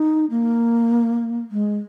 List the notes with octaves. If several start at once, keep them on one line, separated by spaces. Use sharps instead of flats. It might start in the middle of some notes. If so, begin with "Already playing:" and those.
Already playing: D#4
A#3
G#3